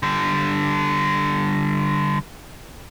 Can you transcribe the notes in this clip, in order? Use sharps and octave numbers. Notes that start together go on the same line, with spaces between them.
D3 G3